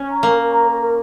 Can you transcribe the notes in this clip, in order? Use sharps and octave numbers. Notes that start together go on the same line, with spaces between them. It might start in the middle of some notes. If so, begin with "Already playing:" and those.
Already playing: C#4
A#5
A#3 A#4
A#4
A#5
A#4
A#4